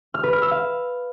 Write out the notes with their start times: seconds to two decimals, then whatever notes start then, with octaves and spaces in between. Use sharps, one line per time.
0.14 F6
0.23 B4
0.33 F6
0.42 E6
0.51 F5